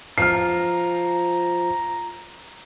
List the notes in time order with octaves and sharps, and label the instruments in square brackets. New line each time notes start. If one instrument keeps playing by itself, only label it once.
[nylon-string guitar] F3 [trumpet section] A#5 [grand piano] F6 C7